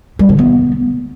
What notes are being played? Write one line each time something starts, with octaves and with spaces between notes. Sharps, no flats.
G3
D3
B3